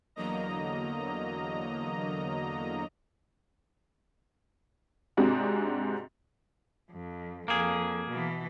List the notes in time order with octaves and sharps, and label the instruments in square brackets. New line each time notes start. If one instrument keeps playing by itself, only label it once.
[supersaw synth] E2 D3 F#3 A#3 D#5 A#5
[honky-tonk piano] G#2 C3 C4 D4 F#4 G#4
[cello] F2
[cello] F2 [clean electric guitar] A#3 G#4
[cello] B2 E3